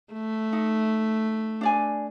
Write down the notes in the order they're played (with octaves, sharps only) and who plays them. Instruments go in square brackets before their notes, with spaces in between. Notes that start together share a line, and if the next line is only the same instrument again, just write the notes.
[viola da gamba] A3
[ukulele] D#4
D4 D5 G#5